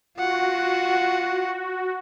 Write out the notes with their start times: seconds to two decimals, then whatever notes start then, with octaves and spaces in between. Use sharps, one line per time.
0.18 F4 F#4 F#5